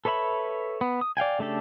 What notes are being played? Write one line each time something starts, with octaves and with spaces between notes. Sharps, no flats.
A4 B4 C#5 E5 B5
B3
D#6
D5 F5 G5 G#5
C#3 A3 D4 G4 A4